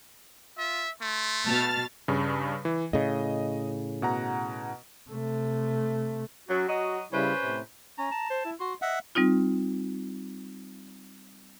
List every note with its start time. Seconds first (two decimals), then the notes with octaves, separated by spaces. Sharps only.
0.58 F4 E5
1.01 A3 C6
1.45 B2 A5 F6 A6
2.08 G2 C#3
2.65 E3
2.93 A2 C#3 D#5
4.02 B2 F#5 A#5
5.09 C3 A3
6.48 F#2 F#3 F#4
6.68 F#3 D#5
7.12 C#3 G3 C#4 E4 B4 C5
7.39 A2 C3
7.98 C#4 A#5
8.11 A5
8.30 C5
8.45 E4
8.60 F#4 C6
8.82 D#5 E5 F#5
9.15 G3 C4 D#4 F4